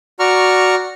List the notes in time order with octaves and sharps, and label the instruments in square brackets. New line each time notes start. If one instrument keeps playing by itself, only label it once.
[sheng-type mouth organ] F#4 D5 A#5 C#6 F6